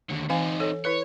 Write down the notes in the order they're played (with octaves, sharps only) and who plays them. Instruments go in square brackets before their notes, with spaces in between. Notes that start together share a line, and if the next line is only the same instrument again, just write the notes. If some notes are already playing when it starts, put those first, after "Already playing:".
[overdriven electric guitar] D#2 D3
[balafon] E3 F5 G#5 [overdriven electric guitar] C4 D#4
[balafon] A4 C#5
[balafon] E4 B4 [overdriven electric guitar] C#5